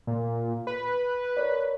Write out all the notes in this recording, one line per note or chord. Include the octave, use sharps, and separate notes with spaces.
A#2
B4
A#4 C#5 D5